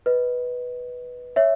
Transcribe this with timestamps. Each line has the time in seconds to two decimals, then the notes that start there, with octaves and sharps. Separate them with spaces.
0.06 B4 D#5
1.36 C#5 E5